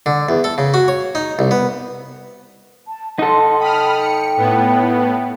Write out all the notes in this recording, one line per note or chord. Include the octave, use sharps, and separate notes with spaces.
D3
E2
A4
C#3
F#4
C#5
D#4
C2
B3
A5
D#4 A4 F#5 A5 C6
G5 B5 D#6 F6
C#7
A2 B3